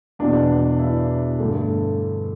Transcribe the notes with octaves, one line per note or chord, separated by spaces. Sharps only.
E2 B2 D4
E4
G2 D3 A3